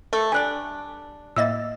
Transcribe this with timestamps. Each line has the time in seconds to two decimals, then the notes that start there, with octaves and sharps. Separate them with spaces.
0.13 F3 A3 A4
0.32 G3 D4 D5 G#5 F#6
1.36 A2 A#3 D#5 E5 E6 A6